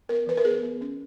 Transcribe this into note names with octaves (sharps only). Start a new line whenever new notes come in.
B3 A#4
E3 B4
A#4
B3 G#4
B3
C#4